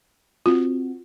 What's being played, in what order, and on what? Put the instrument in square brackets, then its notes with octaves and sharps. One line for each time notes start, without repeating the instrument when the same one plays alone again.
[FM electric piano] C4 F#4 [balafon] F4